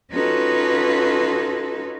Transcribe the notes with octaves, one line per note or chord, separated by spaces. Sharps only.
C#4 D#4 F4 F#4 A4 B4